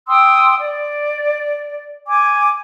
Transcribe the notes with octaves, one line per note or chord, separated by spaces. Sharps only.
G5 C6 D#6 E6
D5
G#5 D6